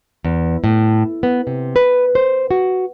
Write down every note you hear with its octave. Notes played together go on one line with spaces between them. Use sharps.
E2
A2
B3
C3
B4
C5
F#4